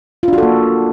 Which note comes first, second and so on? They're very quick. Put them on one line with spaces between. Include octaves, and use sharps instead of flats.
F4 D4 F#4 A4 A#3